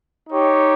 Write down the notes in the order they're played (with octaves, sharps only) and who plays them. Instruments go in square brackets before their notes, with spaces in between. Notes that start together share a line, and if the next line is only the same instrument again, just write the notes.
[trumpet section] D#4 G4 C#5